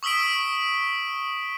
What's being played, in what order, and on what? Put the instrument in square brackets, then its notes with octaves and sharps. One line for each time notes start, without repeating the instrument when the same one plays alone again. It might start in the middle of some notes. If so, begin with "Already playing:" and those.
[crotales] C#6 D#6 E6 B6 D7